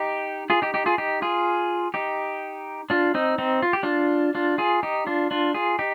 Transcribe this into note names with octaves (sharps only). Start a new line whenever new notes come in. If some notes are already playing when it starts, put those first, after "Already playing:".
Already playing: D#4 G4
F4 G#4
D#4 G4
D#4 G4
F4 G#4
D#4 G4
F4 G#4
D#4 G4
D4 F4
C4 D#4
C4 D#4
F4
G4
D4 F4
D4 F4
F4 G#4
D#4 G4
D4 F4
D4 F4
F4 G#4
D#4 G4